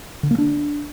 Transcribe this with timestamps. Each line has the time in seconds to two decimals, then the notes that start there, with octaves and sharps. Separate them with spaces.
0.23 D3
0.31 A#3
0.38 D4